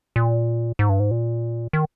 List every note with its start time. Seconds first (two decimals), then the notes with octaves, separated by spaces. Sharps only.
0.16 A#2
0.79 G#2
0.89 G2
1.00 G#2
1.11 A#2
1.73 D#3